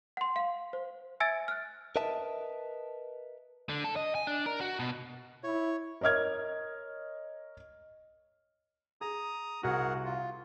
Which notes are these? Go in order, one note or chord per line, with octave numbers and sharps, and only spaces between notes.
F#5 C6
F5
C5
E5 G#5 E6 G#6 A6 D7
F6 F#6
A#4 B4 D#5 E5 A5
D3
A4
D#5
G#5
D4
A#4
F#4
B2
E4 C#5
A#4 C#5 D#5 F6 G#6
G#4 A#5 D#6
C2 F#4 G#4 A#4 F#5
F4